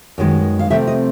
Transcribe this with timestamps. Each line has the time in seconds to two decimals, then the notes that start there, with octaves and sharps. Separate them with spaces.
0.18 F#2 D#3 G#3 B3
0.59 F5
0.70 C3 F3 A3 C4 E5
0.87 D#5